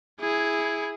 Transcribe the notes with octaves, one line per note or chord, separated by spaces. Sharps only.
E4 G#4